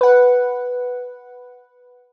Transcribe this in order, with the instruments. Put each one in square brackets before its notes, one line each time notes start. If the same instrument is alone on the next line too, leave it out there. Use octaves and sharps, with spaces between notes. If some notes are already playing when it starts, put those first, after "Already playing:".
[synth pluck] B4 F#5